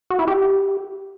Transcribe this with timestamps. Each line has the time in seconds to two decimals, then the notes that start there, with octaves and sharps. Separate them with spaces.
0.10 F#4
0.19 E4
0.28 G4